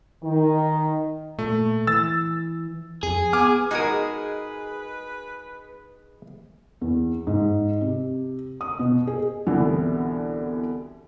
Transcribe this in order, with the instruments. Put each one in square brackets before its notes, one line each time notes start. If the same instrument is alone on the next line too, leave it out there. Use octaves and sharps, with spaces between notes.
[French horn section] D#3
[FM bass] A#2 [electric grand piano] A3
[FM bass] E3 [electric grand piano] E6 A6
[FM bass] F2 [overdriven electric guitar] G#4
[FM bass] B3 [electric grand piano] G#5 D6 F6
[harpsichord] G#3 D#6 [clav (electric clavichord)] D#4 F#4 A#4 [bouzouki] G#4 [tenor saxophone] B4
[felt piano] E2
G#2
C3
D#6
B2
G#4
C2 B2 D3 E3 B3